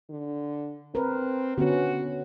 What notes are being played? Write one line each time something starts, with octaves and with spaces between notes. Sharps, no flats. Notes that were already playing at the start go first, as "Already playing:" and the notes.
D3
C4 A#4 B4
D3 B3 C#4 F#4